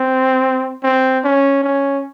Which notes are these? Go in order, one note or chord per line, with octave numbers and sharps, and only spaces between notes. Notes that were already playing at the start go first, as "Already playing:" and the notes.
Already playing: C4
C4
C#4
C#4